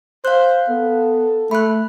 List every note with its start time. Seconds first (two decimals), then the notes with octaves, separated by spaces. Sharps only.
0.25 C5 F5 F#6
0.69 B3 A4
1.51 A3 B5 F#6